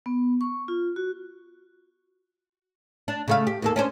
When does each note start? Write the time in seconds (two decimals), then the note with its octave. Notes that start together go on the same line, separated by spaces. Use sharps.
0.06 B3
0.41 C#6
0.68 F4
0.96 F#4
3.08 D4
3.28 C#3 A3 F5
3.47 G4
3.62 D#2 A#3 A4
3.76 C#4 D4 C5